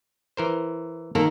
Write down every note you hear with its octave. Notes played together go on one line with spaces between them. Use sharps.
E3 A#4 C5
D#3 A#3 A4 A#4